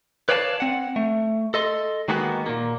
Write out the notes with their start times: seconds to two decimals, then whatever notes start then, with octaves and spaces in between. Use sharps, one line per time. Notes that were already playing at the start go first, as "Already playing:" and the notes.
0.29 B4 C#5 D5 F5 G5 A5
0.60 C4 F#5
0.96 A3
1.54 A4 D#5 C6
2.08 D#3 G#3 A#3 B3 F#4
2.46 A#2 A#3